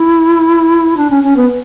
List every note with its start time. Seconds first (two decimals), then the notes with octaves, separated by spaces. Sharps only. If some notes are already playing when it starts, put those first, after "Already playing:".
Already playing: E4
0.97 D4
1.10 C#4
1.24 C#4
1.37 B3